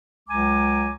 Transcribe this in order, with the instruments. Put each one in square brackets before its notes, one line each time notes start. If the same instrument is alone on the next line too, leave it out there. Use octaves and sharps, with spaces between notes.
[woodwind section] C#2 F#3 G#3 G#5 A#5 D6